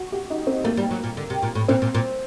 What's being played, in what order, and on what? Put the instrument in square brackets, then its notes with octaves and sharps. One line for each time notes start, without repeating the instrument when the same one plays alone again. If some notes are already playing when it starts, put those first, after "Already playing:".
Already playing: [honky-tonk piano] F#4
G4
D#4
C4
[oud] A3 [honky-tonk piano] A#3
[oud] G3
F#3
A#2
D3
C3
A#2
A2
[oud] A#2 [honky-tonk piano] C4
[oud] A#2
A#2